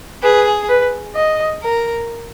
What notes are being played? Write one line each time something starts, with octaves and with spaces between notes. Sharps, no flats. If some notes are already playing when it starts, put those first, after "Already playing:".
G#4 B4
B4
D#5
A#4